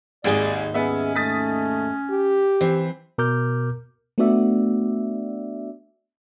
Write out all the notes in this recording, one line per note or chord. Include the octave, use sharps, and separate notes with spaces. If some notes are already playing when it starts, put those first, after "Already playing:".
G#1 D#2 G#2 G#3 G#4 D5 D#5
B3 C#4 G#4 E5
A3 D#6 A6 B6
G4
E3 C4
B2 A#4 D6 F6 G6
A3 B3 D4 F#4 D5 E5